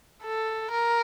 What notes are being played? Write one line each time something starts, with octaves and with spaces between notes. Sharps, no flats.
A4
A#4